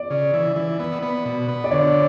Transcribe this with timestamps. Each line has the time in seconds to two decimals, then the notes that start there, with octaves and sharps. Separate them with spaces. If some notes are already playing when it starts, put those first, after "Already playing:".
Already playing: D5
0.10 C#3
0.34 E3
0.56 E3
0.79 B3
1.02 B3
1.25 B2
1.48 B3
1.64 D5
1.71 D3 C#5